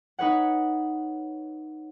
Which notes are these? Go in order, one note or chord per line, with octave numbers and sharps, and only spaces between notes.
D#4 B4 C#5 F#5